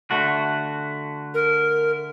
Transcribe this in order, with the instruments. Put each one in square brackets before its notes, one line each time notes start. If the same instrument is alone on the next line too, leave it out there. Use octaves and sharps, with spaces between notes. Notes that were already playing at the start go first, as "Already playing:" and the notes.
[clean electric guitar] D3 A3 F#4
[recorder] A#4